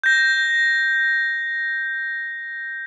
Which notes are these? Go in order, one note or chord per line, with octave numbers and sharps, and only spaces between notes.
G6 A#6